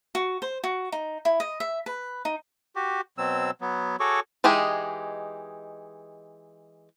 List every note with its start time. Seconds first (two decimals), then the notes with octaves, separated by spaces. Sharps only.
0.15 F#4
0.42 C5
0.64 F#4
0.92 D#4
1.25 E4
1.40 D#5
1.60 E5
1.86 B4
2.25 D#4
2.76 F#4 G4
3.18 B2 F#3 C4 E6
3.61 F#3 B3
4.00 F#4 G#4 A4 C#5 C#6 D6
4.44 E3 G#3 D#4 G4 G#4